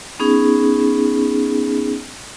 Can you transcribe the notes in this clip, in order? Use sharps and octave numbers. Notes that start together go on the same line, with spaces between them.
B3 C#4 D#4 G#4